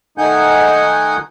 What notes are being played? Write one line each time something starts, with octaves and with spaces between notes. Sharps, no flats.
D#3 A3 D#4 F#5 G#5 G6